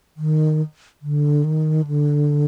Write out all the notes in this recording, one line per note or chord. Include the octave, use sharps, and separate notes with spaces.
D#3
D3
D#3
D3